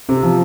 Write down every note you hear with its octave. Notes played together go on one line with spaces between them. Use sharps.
C3
F3